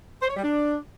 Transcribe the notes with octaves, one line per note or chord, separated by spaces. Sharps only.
C5
C#5
G3
D4